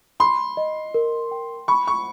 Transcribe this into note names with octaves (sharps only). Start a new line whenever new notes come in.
B5 C6
D#5
A#4
G5
B5 C#6
C#6